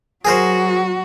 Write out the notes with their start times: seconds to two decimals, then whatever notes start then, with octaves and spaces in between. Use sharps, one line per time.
0.25 F#3 F#4 G#4 A#4 C5